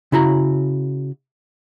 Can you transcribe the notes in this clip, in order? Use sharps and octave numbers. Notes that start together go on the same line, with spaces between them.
C#3 E4 F#4 A#5